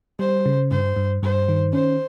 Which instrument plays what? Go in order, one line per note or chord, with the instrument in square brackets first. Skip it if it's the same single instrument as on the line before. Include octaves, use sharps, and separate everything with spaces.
[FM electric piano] G3 [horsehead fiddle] C5
[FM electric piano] C#3
[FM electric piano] G2 [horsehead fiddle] C5
[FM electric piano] G2
[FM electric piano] G2 [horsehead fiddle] C5
[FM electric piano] D#3
[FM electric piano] C#4 [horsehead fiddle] C5